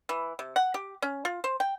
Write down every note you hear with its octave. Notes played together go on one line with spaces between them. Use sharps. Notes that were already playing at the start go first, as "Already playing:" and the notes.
E3
C3
F#5
G4
C#4
F4
C5
G5